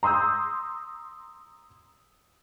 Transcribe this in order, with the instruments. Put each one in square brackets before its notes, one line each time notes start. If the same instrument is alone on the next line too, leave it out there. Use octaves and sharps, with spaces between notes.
[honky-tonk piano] A#5 C6 D#6 E6 G6